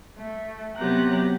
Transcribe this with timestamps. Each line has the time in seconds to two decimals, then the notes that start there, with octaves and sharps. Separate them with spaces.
0.17 A3
0.77 C3 F#3 B3 G4 A#5 F#6